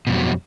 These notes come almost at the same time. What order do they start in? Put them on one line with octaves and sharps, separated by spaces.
B2 F2 G3 F#3